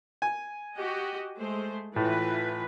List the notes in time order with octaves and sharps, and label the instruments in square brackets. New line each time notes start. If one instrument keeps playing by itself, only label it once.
[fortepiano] G#5
[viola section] F#4 G4 D#5
G#3 A3 C5
[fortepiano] A2 [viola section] E3 F4 B4